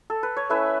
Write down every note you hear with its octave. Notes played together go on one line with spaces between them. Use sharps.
A4
B4
C#5
A3 C#4 E4 B4 E5